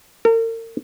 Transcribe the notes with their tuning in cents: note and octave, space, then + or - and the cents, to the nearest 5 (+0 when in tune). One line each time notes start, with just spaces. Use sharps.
A#4 -40